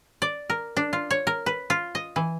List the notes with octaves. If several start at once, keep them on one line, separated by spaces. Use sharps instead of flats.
D5
A#4
D4
F4
C#5
A#4
B4
F4
D#5
E3